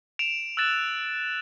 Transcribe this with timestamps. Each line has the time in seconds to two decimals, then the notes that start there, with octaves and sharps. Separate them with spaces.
0.19 D7 E7 F7
0.57 E6 F#6 A6 E7